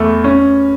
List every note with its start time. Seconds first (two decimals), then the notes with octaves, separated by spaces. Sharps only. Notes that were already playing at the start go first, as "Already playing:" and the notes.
Already playing: E2 A3
0.24 C#4